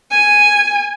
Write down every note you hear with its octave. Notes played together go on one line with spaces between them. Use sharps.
G#5